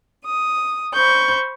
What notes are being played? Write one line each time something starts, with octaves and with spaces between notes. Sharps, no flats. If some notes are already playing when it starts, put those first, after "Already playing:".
D#6
C5 B5 C#6 G6